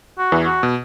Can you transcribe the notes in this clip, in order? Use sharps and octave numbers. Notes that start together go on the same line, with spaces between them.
F#4
E2 E3
F#4
B2